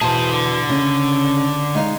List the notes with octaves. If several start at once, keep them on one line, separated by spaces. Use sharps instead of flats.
E2 B2 G#4 C5 A5
D3
C#3 C#4
G#3 D#4 F5